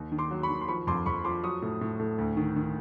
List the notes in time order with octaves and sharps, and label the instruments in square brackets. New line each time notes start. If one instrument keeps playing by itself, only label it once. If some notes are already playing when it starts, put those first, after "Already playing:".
Already playing: [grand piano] D#2
D#3
C6 D6
F#3
B5 C#6
D#3
C6
F3 B5 C#6
F2 C6 D6
F2 B5 C#6
F3 C6 D6
F#3 C#6 D#6
A2
A2
A2
D2
D#3
D#3